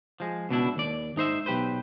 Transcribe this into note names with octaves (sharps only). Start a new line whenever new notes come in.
F3 G#3
C#2 B2 D4 E4
D#2 D5
G#2 D#4 C5 E5
B1 G4 B4 C5